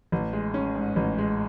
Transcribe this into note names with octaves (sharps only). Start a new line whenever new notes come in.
A1
G#3
C#4
G#2
A1
G#3